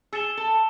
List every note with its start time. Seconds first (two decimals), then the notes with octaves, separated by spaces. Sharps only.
0.13 G#4 E6 A6 C#7 E7 G7
0.37 A4